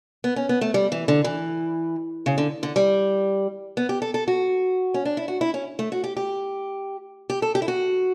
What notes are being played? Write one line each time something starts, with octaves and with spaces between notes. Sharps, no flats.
B3
C#4
B3
A3
G3
E3
D3
E3
C#3
D3
D3
G3
B3
G4
A4
A4
F#4
C#4
D4
E4
F#4
E4
C#4
A3
F#4
G4
G4
G4
A4
G4
E4
F#4